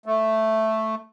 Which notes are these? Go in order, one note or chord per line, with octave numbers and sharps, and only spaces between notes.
A3